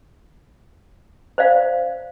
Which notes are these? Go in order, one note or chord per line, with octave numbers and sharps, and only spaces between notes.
C5 D5 F5